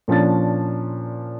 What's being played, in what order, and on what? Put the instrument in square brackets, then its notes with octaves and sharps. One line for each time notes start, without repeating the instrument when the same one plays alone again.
[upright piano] A#2 F3 C#4 D4 A6